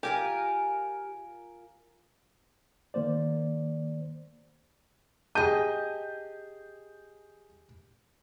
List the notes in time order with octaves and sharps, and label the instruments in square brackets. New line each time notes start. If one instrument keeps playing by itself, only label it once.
[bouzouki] F4 A#4 G#5 [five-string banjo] G4
[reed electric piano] D#3 A#3 C5 D5
[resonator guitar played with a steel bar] G4 D#5 [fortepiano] G#4 [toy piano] A5 [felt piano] G6